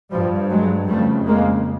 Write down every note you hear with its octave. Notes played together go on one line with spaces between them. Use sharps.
G2 F3 G3
F#3 G#3
F2 C#3 G3 A3
G#3 A#3